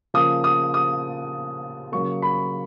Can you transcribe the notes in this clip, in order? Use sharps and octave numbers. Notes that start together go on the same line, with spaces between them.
C#3 F3 A#3 D#6
D#6
D#6
C#3 F#3 A#3 C#6
B5